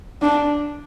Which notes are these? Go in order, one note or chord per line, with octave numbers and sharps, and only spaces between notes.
D4